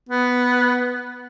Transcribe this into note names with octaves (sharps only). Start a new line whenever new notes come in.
B3